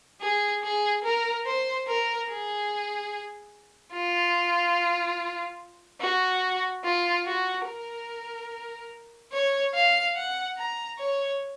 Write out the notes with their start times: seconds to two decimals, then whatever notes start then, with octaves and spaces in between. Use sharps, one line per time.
0.21 G#4
0.63 G#4
1.04 A#4
1.46 C5
1.87 A#4
2.29 G#4
3.94 F4
6.01 F#4
6.85 F4
7.26 F#4
7.67 A#4
9.33 C#5
9.74 F5
10.16 F#5
10.57 A#5
10.99 C#5